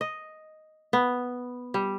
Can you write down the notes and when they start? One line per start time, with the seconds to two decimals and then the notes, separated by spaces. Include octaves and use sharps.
0.01 D#5
0.93 B3
1.74 G3